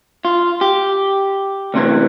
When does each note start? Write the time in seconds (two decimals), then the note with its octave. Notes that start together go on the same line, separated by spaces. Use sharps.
0.25 F4
0.61 G4
1.74 D2 C3 E3